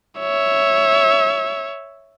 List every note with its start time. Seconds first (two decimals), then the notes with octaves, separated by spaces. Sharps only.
0.20 C#5 E5